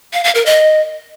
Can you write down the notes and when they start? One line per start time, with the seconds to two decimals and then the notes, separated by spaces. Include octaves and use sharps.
0.13 F5
0.24 F5
0.35 A#4
0.46 D#5